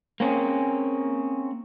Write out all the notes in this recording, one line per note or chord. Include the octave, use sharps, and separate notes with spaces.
A#3 C4 C#4 G#4